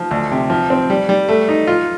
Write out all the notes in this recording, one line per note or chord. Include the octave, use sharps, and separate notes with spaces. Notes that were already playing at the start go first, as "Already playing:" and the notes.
Already playing: F3
D2
C3
F3
C4
G3
G3
A3
D#4
F4